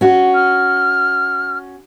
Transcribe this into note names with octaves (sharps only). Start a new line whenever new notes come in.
C#4 F#4
F6